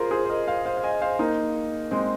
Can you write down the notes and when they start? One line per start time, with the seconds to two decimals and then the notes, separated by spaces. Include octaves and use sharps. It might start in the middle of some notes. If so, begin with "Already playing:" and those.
Already playing: F4 G#4 A#4 C5
0.11 G#4 C5
0.25 C5
0.29 A#4 D#5
0.47 C5 F5
0.66 C5 F5
0.77 F5
0.84 D#5 G#5
1.01 C5 F5
1.19 A#3 D#4
1.91 G#3 C4